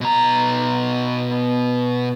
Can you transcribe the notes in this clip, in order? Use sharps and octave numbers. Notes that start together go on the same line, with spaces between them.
B2 A#5